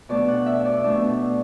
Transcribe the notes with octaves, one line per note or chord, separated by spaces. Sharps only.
B2 A3 D4 D5
F#5
E5
D5
B2 A3 D4